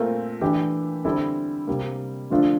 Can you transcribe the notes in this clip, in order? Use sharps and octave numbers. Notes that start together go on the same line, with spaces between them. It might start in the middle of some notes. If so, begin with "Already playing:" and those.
Already playing: A#2 A3 C4 F4 A#4
E3 A3 D4 G4
D3 G3 C4 E4 A4
C3 G3 A#3
D3 F3 A3 D4 F4